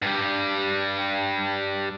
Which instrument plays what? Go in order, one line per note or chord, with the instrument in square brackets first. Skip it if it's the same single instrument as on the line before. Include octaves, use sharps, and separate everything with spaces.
[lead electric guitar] G2 G3